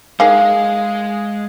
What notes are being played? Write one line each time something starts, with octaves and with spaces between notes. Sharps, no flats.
G#3 A#3 D#4 G#4 F5